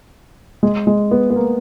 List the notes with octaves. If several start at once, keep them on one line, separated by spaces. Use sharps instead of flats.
G#3
G#3
B3
B3
A#3